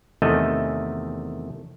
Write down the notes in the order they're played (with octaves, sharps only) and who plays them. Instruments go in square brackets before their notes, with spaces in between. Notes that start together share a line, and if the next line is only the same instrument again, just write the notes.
[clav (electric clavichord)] E2 C3 D#3 A3 D#5 G#5